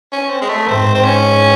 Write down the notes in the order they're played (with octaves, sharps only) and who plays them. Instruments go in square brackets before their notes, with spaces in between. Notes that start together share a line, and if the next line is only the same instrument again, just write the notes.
[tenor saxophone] C#4
C4
G#3
A3
[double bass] G#2 [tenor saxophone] C4
[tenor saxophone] C4
C#4